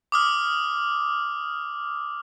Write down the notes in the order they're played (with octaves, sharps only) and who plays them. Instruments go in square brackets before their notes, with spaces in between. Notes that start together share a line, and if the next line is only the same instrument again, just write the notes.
[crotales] D6 D#6 F6